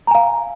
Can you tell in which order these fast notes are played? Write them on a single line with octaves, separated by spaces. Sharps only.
A#5 G#5 F5